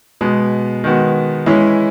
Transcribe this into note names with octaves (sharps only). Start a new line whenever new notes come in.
B2 G#3 B3
D#3 G#3 B3 F#4
E3 G#3 C#4 E4